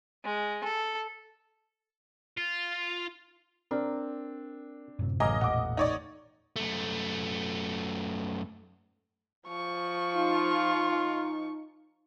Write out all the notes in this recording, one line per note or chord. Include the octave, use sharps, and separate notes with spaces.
G#3
A4
F4
C4 D4 A#4
F#2 A2 C3
A1 F#2 C#3 D#5 F5 G#5 A#5 D6
E1 A#2 F#5 D6
D#4 C#5 D5
F#2 A3
F3 C#6
D#4 F4